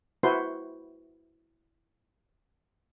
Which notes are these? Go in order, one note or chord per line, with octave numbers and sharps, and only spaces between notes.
E4 F#4 B4 C5 C6